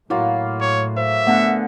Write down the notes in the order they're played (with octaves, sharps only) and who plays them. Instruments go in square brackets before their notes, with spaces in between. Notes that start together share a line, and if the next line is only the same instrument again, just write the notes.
[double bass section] A2 [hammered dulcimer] F#3 A#3 F4 [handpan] E4
[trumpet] C#5
[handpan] C5 [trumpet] E5
[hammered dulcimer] D3 G#4 [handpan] A3 B3 F#5